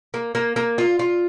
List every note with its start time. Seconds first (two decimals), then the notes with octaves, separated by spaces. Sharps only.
0.14 A#3
0.35 A#3
0.56 A#3
0.78 F4
0.99 F4